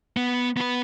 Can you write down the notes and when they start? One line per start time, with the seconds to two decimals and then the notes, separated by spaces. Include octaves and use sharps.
0.17 B3
0.57 B3 B4